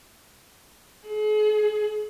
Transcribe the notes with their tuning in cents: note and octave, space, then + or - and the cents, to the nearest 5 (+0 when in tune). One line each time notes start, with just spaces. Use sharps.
G#4 +40